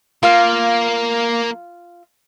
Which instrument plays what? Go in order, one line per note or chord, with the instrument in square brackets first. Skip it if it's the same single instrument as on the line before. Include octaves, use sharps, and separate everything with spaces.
[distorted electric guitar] A#3 [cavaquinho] F4 F5